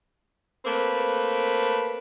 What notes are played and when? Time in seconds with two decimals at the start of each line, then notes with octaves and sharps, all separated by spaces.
0.65 A3 A#3 C4 B4